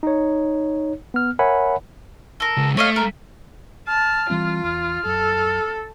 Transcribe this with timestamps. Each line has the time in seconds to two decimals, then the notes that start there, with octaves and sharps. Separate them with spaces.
0.03 D#4 C#5
1.14 B3 F6
1.39 A#4 C#5 E5 F#5 G#5 B5
2.40 A4 A#4
2.57 C#2
2.77 A3 C#5 D#5 F5
2.96 A#4
3.87 A5 F6
4.30 E3 G3 C4 F4
4.64 E2 F6
5.06 F#2 A4